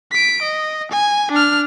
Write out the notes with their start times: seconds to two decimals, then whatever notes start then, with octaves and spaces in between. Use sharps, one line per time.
0.12 B6 D7
0.42 D#5
0.92 G#5
1.32 D4 F6